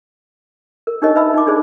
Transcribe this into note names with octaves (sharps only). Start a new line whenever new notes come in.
A#4
D4 D#4 G4 A#4 C#5 D#5
B4 E5 A5 B5 E6
D#4 D6
D4 D#4 G#4 C5 D5